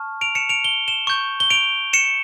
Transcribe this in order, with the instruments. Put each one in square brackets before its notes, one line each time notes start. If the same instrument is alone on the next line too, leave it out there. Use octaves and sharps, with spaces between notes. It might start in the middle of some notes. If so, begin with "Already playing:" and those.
Already playing: [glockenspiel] A5 C#6 F6
D7 F7
C#7 E7
D7 F7
G7
E7 G7
C#6 G6
G7
D7 F7
C#7 E7